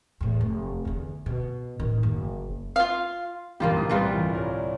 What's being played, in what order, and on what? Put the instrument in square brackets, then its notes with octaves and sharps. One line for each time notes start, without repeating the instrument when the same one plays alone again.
[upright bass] E2 A2
F1
E2 D3
B2
A1 D#3
F#1
[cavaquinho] F4 F5
[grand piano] F#1 C2 G2 [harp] E3 A#4 [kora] A#3 F4 G4
[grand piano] G#2 D#6 [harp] C4 G6
[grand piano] C2 A#2 [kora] G3 F4 B4
[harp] D2 G#2 E3
A#4 C#5 D5